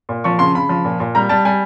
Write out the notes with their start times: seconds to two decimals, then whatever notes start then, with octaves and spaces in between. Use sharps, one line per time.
0.09 A#2
0.24 F3 C#6
0.39 C#3 C6
0.55 C#3 B5
0.69 F3
0.85 A#2
1.00 A#2
1.15 G3 A#5
1.29 G3 A5
1.45 G3 G#5